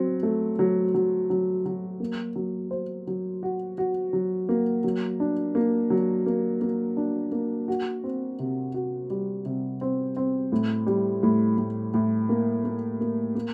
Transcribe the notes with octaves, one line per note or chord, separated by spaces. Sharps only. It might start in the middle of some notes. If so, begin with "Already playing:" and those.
Already playing: F#3 C4
A3
F#3
F#3
F#3
F#3
A#3
F#3
C5
F#3
F#4
F#4
F#3
A#3
F#3
D4
A#3
F#3
A#3
A#3
D4
A#3
F#4
C4
C3
F#4
G3
C3
C4
C4
A2
G3
A2
A2
A2
A#3
A#3
A#3
A#3